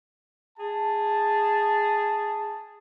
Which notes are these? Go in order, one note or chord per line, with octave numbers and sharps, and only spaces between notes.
G#4 A5